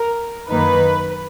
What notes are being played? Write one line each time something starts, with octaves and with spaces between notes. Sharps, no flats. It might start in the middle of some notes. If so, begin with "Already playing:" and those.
Already playing: A#4
F#2 D#3 A#3 D#4 B4